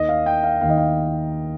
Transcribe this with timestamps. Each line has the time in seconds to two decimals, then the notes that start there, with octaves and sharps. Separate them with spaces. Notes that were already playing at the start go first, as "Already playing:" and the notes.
Already playing: D#2 D#3 D#5
0.09 F5
0.26 G5
0.43 F5
0.61 D#2 F5
0.65 D#3 D#5
0.77 F5